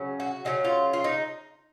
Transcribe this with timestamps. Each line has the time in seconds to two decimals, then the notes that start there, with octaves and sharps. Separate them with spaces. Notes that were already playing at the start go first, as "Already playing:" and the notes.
Already playing: C#3 F#3 C#4
0.20 F#4
0.45 C#3 F#3 C#4 D#4
0.64 F4
0.93 F4
1.04 D#4